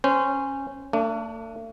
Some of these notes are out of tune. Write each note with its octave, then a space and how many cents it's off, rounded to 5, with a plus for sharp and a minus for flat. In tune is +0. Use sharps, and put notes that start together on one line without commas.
C#4 -15 C5 -20
A3 +45 D4 +0